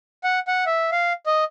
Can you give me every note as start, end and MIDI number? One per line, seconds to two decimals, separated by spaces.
0.24 0.39 78
0.48 0.64 78
0.66 0.90 76
0.92 1.13 77
1.26 1.44 75